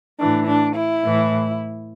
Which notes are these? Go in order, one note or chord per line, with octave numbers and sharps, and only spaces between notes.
A2 E3 D4
D4
E4
A2 E3